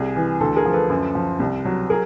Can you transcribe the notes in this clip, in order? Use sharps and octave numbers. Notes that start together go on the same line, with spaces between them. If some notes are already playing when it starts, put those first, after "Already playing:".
Already playing: C2 G#4
E3
D2 A4
G#4 A#4
F3
A4 B4
F#2
F3
C2
F#3
G#4 A#4